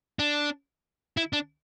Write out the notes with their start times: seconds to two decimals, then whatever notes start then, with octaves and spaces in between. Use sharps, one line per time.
0.19 D4
1.17 E4
1.33 D4